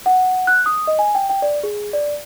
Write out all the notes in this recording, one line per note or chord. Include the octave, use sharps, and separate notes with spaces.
F#5
F#6
D#6
D#5
G#5
G5
G5
D5
G#4
D5